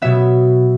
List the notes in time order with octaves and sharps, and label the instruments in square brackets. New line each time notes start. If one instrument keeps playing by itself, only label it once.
[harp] B2 F#3 B3 E5